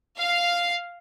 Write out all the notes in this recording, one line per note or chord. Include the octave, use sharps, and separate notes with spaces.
F5